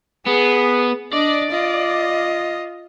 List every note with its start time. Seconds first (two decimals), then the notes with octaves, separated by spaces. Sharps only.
0.26 B3 G#4
1.13 D4 D5 D#5
1.51 F4 D#5